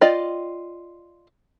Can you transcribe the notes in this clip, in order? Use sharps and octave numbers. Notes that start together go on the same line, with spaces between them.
F4 D5 D#5 G5